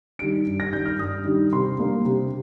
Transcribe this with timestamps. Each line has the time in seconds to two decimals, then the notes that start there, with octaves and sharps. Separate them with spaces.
0.19 D#3 G3 D4 D7
0.46 G2
0.60 A#6
0.73 D#3 G3 D4 G6
0.86 F6
0.99 G2 D#6
1.25 D#3 G3 D4
1.53 C3 C6
1.78 G3 A#3 D4
2.05 C3